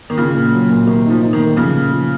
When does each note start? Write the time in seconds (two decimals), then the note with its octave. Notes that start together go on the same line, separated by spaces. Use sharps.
0.10 D#3
0.17 C#3 F4
0.34 A#2
0.52 F#3
0.70 A#2
0.87 C3 D#3
1.04 D#4
1.10 F3
1.21 D#4
1.33 D#3
1.39 A3
1.56 C#3 F3
1.73 A#2
1.91 F3